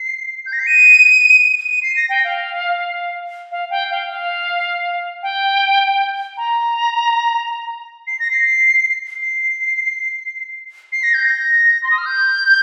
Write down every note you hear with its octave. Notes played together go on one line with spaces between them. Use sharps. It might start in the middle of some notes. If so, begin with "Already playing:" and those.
Already playing: C7
G6
A#6
C7
D#7
D#7
C7
A#6
G5
F5
F5
G5
F5
F5
G5
A#5
C7
A#6
C7
C7
C7
A#6
G6
A#6
C6
D#6
F6
G6